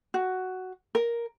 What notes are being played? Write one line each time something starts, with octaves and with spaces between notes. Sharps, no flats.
F#4
A#4